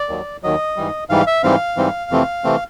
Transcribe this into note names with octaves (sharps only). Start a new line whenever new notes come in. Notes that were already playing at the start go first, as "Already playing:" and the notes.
Already playing: D5
D#2 D#3 F#3
D#2 D#3 F#3 D#5
G#2 E3 G3
G#2 E3 G3 F5
E5
G#2 E3 G3 C4 F5
G#2 E3 G3 C4
F2 C3 E3 A3 C4
C3 E3 A3 C4